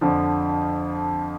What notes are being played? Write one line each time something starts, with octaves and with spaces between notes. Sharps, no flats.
F2 D3 F3